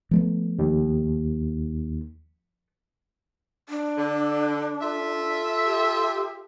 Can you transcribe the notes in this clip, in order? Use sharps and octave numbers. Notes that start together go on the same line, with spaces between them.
F3 A3 B3
D#2
D4
D3
F4 A4 E5
G4